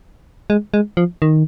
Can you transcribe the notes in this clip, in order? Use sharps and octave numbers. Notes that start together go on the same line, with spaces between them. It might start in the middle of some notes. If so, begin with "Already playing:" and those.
G#3
G#3
F3
D#3